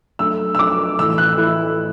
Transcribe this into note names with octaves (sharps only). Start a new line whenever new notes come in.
F#3 A3 D4 A4 E6
E6
F#3 A3 D4 A4 D6
A2 E3 A3 E4 A4 E6
F#6
A2 E3 A3 E4 A4